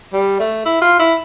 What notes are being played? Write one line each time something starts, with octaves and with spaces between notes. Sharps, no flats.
G3
A3
E4
F4
E4